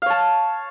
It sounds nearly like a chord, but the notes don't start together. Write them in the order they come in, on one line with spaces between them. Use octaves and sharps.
F5 C#5 A5